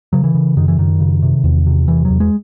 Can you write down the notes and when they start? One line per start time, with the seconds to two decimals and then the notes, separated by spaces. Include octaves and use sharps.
0.13 C#3 F#3
0.24 E3
0.34 C#3
0.57 F#2 D#3
0.68 E3
0.78 F#2 D#3
1.00 C#3
1.22 C3
1.44 E2
1.67 C3
1.88 E2 E3
2.05 E2 F#3
2.20 G#3